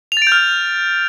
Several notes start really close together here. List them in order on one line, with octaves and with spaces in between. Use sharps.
F7 A6 D7 G6 F6